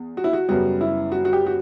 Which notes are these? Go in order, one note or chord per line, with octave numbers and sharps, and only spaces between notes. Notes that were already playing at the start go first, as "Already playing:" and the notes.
Already playing: E2
F#4
E4
F#4
F#2 C#3 G3 B3 F#4
E4
F#4
F#4
G4
F#4